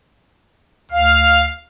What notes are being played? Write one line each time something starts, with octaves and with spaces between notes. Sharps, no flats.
D2 F5